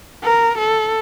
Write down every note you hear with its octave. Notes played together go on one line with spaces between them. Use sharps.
A#4
A4